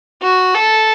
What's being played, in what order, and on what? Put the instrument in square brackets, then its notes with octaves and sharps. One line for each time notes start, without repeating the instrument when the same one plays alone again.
[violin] F#4
A4